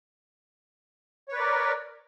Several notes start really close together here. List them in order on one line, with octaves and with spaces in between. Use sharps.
C#5 B4 D5 A#4